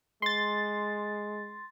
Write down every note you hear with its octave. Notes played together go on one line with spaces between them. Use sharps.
G#3 C6 A6